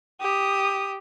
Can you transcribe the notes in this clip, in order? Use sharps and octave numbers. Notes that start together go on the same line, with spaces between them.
G4 D#6